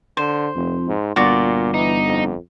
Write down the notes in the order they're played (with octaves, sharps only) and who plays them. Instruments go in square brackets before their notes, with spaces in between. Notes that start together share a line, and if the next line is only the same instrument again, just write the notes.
[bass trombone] D3 [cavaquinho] C5
[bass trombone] F1 [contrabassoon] F2
[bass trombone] G#2
[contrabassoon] G1 [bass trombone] A#2 [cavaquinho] F4 F#4 D5
[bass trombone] E3 [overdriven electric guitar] D#4
[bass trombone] F2